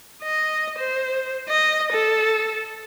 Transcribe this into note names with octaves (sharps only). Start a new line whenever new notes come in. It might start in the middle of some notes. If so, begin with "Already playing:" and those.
D#5
C5
D#5
A4